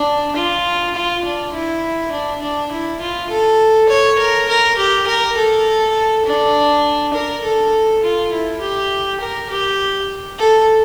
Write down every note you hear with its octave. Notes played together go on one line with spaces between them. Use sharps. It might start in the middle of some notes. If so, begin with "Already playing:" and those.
Already playing: D4
F4
F4
D4
E4
D4
D4
E4
F4
A4
C#5
A#4
A#4
G4
A#4
A4
D4
A#4
A4
F4
E4
G4
A#4
G4
A4